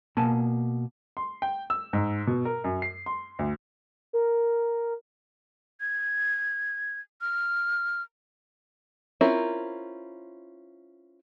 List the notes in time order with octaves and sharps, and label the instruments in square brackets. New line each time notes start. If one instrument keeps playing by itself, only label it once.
[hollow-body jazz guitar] B2 A#3 G#5 A5
[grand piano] C6
G5
E6
G#2
B2
A#4
F#2
C7
C6
D2
[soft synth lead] A#4
[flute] G#6
F6
[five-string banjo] C4 C#4 E4 F4 A#4